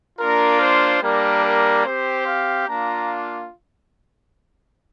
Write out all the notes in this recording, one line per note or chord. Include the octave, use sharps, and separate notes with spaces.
A#3 D4 F4 A#4
C5
G3 A#3 D4 A#4
A#4
C4 G4 C5
F5
A#3 D4 F4 A#5